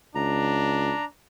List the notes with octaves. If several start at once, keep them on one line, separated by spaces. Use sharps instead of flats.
C#2 D4 A#5